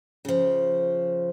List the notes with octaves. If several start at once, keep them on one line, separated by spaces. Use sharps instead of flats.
C#3 F3